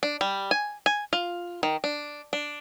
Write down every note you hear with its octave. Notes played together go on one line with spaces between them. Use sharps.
D4
G3
G#5
G#5
F4
D#3
D4
D4